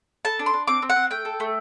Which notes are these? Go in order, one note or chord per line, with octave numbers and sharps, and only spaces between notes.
A4 A5
D4
C6
D4
C4 D6
C4
F#5
C4
A3 G5
A4
A3